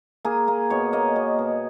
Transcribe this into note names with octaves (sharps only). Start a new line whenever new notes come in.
A#3 G#4
A#3
B2 C#5
A#3 D#5
B2
B2